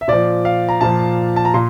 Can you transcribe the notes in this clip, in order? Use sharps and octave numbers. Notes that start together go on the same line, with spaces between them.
E5
A#2 F3 D5
F5
A#5
A#2 F3 A5
A5
A#5
A#2 C6